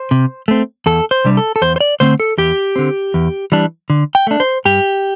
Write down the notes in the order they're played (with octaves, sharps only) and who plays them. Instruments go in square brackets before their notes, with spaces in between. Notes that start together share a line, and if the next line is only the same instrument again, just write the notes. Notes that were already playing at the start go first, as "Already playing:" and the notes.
Already playing: [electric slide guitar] C5
C3
A3 C4
E2 A4
C5
C3 G3 D4
A4
A4
E2 C5
C5
D5
D3 A3 C4 C5
A4
E2 G4
D3 C4
E2
E3 G3 D4
D3
G5
A3 D4
C5
G2 G4